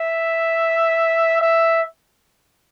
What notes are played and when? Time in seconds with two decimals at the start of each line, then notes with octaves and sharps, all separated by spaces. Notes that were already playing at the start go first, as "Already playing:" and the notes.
Already playing: E5
1.41 E5